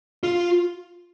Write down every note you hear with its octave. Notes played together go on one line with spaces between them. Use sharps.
F4